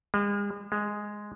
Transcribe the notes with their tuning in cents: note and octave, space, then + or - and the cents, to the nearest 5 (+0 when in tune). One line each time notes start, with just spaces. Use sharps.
G#3 -40
G#3 +0